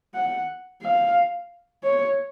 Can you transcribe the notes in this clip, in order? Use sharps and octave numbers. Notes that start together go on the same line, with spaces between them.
F#5
F5
C#5